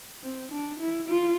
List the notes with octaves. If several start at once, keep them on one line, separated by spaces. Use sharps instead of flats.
C4
D4
E4
F4